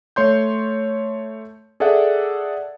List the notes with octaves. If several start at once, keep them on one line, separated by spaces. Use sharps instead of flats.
A3 C#5 C6 G6
G#4 A4 D5 E5 F#5